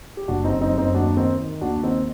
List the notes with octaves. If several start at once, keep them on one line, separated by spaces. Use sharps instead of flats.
G4
F#1 D4 F#4
C4 D#4
F#2
C4 D#4
F#2
C4 D#4
D#2 D4 F#4
D#3 C4 D#4
D#3
D#2 D4 F#4
D#3 C4 D#4